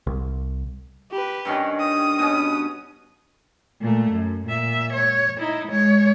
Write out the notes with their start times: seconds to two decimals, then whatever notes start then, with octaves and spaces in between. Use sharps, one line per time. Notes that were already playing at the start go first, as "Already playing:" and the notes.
0.07 C2
1.10 G4 B4
1.45 G2 D#3 C#4
1.80 D#6
2.19 B2 C#4
3.81 A#2 A3
4.11 F#2
4.47 A#2 E5
4.93 C#5
5.39 D#4 E4
5.68 G#3 C#5